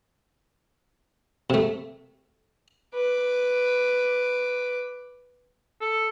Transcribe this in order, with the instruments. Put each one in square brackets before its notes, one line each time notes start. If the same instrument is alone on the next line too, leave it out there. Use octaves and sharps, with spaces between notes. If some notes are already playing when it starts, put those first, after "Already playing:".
[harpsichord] C3 A3
[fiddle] B4 D6
[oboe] A4